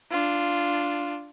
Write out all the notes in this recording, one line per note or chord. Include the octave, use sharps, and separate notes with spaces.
D4 F4